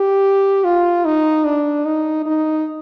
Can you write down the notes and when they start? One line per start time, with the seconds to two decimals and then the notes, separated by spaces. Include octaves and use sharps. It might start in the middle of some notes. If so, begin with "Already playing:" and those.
Already playing: G4
0.64 F4
1.05 D#4
1.45 D4
1.85 D#4
2.26 D#4